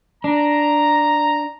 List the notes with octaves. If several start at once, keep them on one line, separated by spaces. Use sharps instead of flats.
D4 A#5